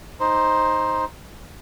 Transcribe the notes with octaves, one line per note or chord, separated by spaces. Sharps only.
D#4 C5